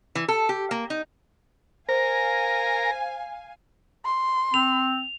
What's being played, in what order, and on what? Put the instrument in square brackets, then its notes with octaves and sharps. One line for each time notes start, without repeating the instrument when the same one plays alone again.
[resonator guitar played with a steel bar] E3
A4
G4
A#3
D#4
[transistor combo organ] A#4 [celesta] C5 [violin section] F5 G#5
[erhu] C6
[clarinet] C4 [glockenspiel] F7